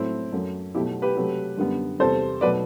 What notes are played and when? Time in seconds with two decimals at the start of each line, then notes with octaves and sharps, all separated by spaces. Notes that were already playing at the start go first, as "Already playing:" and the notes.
Already playing: A2 F#3 A3 C4 E4
0.32 F#2 F#3 A3
0.75 B2 F#3 A3 E4 G4
1.02 G4 B4
1.17 C3 F#3 A3
1.57 F#2 D3 G3 B3
1.99 E2 C3 G3 A4 C5
2.41 B2 F#3 A3 B4 D5